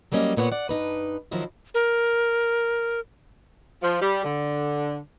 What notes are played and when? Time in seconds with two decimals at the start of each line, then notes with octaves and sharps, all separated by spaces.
0.12 F#3 G3 A#3 C#4 D#5
0.37 D#2 A#2 B3 F#4 C#5 F#5
0.52 D5 F#5
0.69 G2 D#3 D#4 B4
1.31 D#3 F3 F#3 E4 D#5
1.74 A#4
3.83 F3
4.02 G3
4.24 D3